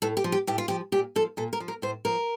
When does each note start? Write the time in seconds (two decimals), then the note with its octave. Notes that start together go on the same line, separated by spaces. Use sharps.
0.02 A2 A4
0.17 G4
0.24 F3
0.32 G4
0.47 A2 G4
0.58 F4
0.68 F3 G4
0.92 A#2 G4
1.16 F3 A4
1.37 A#2 A4
1.53 A#4
1.60 F3
1.68 A#4
1.82 A2 C5
2.05 F3 A#4